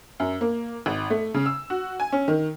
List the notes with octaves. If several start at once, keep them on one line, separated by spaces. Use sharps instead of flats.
F#2
A#3
G#1
A3
C#3
E6
F#4
G#5
C#4
D#3